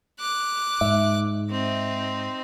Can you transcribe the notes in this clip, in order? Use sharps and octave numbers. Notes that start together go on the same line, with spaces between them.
D6 F#6
G#2 E5
C4 D#4